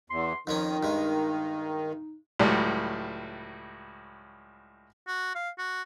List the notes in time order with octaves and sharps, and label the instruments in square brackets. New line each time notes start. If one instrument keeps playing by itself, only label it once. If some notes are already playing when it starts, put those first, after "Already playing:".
[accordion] E2 [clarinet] C6
[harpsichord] F2 F3 C#4 [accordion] D#3 [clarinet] D#4
[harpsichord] G2 G#3
[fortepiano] C#2 A2 F#3 G3
[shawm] F#4
F5
F#4